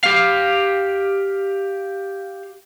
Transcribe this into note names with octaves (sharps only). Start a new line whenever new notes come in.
G4 F5